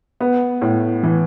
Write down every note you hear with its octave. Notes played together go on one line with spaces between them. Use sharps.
B3
A2
E3